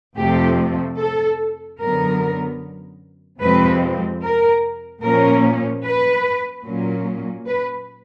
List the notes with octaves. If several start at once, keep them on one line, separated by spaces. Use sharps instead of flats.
F2 C3 F3 A3 C4 G4
A4
F#2 D3 F#3 B3 A#4
F2 C3 F3 G#3 C4 B4
A#4
A#2 F3 A#3 C#4 A#4
B4
A#2 F#3 A#3 C#4
B4